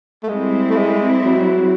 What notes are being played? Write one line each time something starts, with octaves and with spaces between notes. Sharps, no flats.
A3
G3 G#3 C4 E4
A3
G#3
F#3